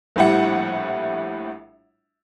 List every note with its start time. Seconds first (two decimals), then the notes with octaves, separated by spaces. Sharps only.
0.16 A#1 A2 G3 E4 F#5